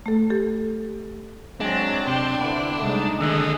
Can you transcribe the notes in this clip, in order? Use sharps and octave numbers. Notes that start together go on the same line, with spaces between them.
A3 A4
G4 A4
F#3 G#3 C4 D4
C3 G5 C6
D3 B3 E4 C5
C2 G#3 A3 D#4
D#2 D3 G#4 A4 D#5